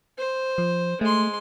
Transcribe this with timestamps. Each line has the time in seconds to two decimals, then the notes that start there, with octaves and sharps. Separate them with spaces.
0.18 C5
0.58 F3
1.01 G#3 A3 C6